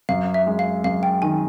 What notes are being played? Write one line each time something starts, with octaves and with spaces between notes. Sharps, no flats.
F#2 F5
E5
G#3
F5
F#2 F5
G5
D#3 G#5